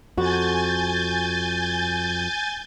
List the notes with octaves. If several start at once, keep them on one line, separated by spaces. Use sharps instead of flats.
F2 F#4 G#5 G6 A6